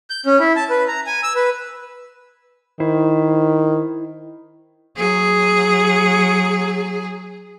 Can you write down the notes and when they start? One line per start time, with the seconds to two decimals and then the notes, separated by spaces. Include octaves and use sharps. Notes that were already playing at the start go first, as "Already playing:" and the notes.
0.10 G6
0.26 C#4
0.40 E4
0.56 A5
0.70 B4
0.88 A#5
1.06 G#5
1.23 E6
1.35 B4
2.80 D#3 E4 C5
4.96 F#3 G#4